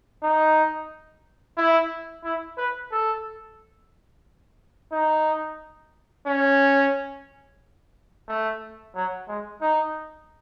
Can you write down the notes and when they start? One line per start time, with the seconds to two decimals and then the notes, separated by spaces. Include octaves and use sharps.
0.23 D#4
1.57 E4
2.24 E4
2.58 B4
2.92 A4
4.92 D#4
6.27 C#4
8.28 A3
8.96 F#3
9.28 G#3
9.61 D#4